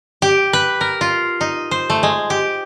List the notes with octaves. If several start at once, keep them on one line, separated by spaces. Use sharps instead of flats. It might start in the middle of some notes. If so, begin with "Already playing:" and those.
G4
B4
A#4
F4
D#4
C5
A3
G#3
G4